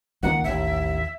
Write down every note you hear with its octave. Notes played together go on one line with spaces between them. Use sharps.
C#2 D#3 A#3 F#5
A1 D#2 E5